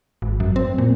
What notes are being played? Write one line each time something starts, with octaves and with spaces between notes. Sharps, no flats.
G#1
F#2
C4
A#2